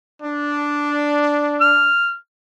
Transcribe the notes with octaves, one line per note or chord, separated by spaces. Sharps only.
D4
F6